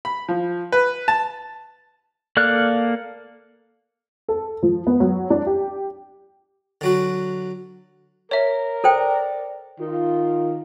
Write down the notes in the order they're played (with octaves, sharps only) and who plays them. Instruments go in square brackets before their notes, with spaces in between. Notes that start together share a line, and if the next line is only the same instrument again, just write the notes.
[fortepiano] B5
F3
B4
A5
[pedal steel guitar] A#3 A4 D5 F6 F#6
[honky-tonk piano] A4
F3
B3
F#3
D4
G4
[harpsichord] D3 F#3 F#4
[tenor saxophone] A#4 [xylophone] C#5 E5
[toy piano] A4 C5 G5 [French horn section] D5
[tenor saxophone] D#3 [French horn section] F4